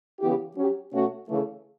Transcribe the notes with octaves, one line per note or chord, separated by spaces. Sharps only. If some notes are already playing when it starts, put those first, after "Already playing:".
C#3 E3 B3 E4 G4
F#3 C#4 G4
B2 A3 C#4 F#4
C#3 E3 A3